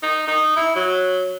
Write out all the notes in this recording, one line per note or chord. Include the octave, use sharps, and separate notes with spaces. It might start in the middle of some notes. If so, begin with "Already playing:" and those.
D#4
D#4
E4
F#3